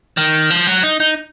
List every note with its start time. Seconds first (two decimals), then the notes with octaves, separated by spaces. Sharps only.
0.17 D#3
0.50 F3
0.67 F#3
0.83 D#4
1.00 D#4